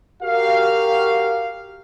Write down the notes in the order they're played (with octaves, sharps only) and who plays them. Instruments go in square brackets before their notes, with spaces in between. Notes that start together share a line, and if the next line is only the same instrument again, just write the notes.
[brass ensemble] F#4 G4 A#4 F5